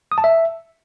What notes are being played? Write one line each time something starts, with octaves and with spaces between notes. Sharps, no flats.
D#6
A5
E5